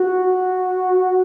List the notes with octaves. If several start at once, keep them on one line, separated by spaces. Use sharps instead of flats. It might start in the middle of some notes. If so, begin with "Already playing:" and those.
Already playing: F#4